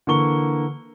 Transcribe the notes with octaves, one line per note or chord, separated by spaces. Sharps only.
D3 E3 A#3 C#6 G7